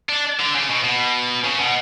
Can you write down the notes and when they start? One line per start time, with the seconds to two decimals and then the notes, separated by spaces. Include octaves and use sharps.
0.09 D4
0.39 D3
0.54 C#3
0.70 B2
0.84 B2
1.44 C#3
1.60 B2